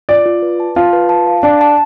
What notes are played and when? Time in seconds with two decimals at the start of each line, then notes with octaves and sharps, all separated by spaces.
0.09 F4 D5
0.26 F4
0.42 B4
0.60 A5
0.76 F4 A5
0.93 B4
1.09 A5
1.27 F5
1.43 D4 A5
1.61 A5